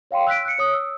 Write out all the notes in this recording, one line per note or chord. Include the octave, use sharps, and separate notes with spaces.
C#5 F5 G5 C6
E6 F#6 B6 D7
F#6 C#7
C#5 D#6
E6